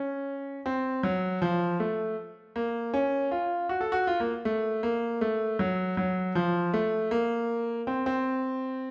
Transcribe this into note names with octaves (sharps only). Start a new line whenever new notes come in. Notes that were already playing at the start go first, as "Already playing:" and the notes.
Already playing: C#4
C4
F#3
F3
A3
A#3
C#4
F4
F#4
A4
F#4
F4
A#3
A3
A#3
A3
F#3
F#3
F3
A3
A#3
C4
C4